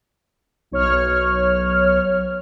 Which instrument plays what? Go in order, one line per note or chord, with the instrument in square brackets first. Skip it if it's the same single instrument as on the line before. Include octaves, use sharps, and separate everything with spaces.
[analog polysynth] B1 C#5 F6